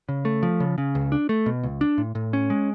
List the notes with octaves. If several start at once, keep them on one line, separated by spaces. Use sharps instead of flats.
C#3
A3
F3
C#3
C#3
C#2
D4
A3
B2
C#2
D4
A2
A2
C#4
G#3